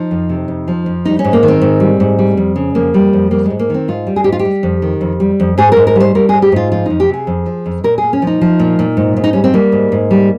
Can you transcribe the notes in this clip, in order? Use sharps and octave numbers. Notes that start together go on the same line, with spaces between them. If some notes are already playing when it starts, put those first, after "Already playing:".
Already playing: F3 D#4
F2
C3
F2
F3
F2
G3 D#4
C#4
G#2
A#3
D#3
C4
G#2
G3
G#2
G3
F2
C#3
F2 A#3
G3
F2
G3 A#3
G#2 G#3
A#3
D#3 C4
G#2 F4
G3
G#4
G#2 G4
F4
G4
G3
F2
D#3
F2
G3
F2
G#2 G#4
G#2 A#4
A#4
G3 C5
G3 A#4
G#4
G#2
G4
G#2 F4
F3 F4
F2 D#4
G4
C3 G#4
F2
F3
F2
A#2 A#4
A#2 G#4
C#4
F3 D#4
F3
A#2
A#2
G#2
G#2
D#4
G3 C#4
C4
G3 A#3
G#2
G#2
G3